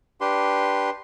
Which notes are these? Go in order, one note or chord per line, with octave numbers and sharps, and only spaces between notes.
D4 G4 B4 C6